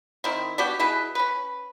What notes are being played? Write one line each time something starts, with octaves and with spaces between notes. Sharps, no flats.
D#3 C4 E4
B3 D4 F#4 G4
B2 E4 G#4 B4
C#4 B4